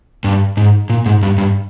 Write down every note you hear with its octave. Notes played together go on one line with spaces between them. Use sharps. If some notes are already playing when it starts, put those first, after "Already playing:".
G2
G#2
A#2
G#2
G2
G2